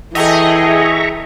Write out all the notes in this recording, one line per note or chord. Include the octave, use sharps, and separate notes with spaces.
E3 G#4 A4 D#5 E5 G5 A#5 C#6